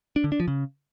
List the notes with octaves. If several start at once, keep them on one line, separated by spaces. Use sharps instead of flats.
D4
D3
D4
F3
C#3